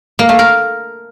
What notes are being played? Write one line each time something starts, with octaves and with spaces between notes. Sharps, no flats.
A#3
A3
A#4